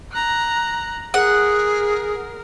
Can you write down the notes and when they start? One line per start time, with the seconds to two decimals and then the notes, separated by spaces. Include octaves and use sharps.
0.12 A#5 F#6
1.14 G#4 A#4 F#5